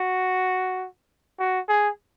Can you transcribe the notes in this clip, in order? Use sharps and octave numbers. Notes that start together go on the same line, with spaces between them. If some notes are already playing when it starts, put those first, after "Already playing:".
Already playing: F#4
F#4
G#4